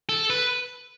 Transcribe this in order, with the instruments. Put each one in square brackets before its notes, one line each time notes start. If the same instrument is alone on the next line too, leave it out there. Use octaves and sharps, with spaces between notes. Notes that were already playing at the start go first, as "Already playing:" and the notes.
[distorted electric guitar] A4
B4